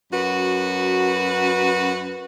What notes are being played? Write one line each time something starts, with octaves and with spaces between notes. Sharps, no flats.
F#2 F#4 B4